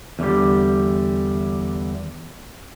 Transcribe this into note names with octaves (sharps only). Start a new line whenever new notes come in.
E2 D3 G3